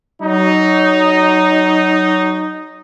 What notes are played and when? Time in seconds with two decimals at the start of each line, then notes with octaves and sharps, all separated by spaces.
0.22 F#3 D#4